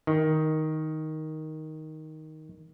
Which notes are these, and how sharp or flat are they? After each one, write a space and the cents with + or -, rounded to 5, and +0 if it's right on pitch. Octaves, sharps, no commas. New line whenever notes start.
D#3 +5